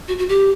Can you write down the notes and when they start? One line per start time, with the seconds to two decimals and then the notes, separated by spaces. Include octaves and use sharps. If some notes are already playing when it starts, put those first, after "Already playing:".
0.08 F#4
0.18 F#4
0.29 G4